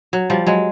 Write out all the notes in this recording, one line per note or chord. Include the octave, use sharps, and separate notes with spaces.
F#3
F3 G3
F#3 G#3